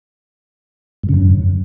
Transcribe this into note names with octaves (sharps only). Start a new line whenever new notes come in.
G2
C#3
F#2